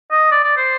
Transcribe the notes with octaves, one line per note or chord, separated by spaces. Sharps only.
D#5
D5
D5
C5